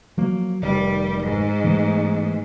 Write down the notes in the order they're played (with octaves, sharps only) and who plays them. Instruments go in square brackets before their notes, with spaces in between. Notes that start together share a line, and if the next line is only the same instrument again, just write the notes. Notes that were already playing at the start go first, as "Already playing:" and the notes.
[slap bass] F3 F#3 A#3
[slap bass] F1 D#3 [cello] G3
[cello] G#2
[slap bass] E3 A3 B3